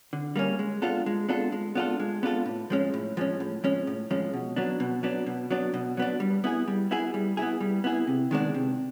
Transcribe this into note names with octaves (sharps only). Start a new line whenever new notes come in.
D3
G3 A#3 C#4
G#3
B3 D4 F4 A4
G#3
B3 D4 F4 A4
G#3
B3 D4 F4 A4
G#3
B3 D4 F4 A4
A2
F3 G#3 C#4
A2
F3 G#3 C#4
A2
F3 G#3 C#4
A2
F3 G#3 C#4
B2
F#3 B3 D4
B2
F#3 B3 D4
B2
F#3 B3 D4
B2
F#3 B3 D4
G3
B3 E4 G#4
G3
B3 E4 G#4
G3
B3 E4 G#4
G3
B3 E4 G#4
C3
D#3 G#3 B3 D4
C3